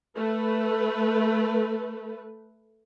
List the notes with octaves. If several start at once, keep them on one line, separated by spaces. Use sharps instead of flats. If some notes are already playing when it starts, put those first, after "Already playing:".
A3 B4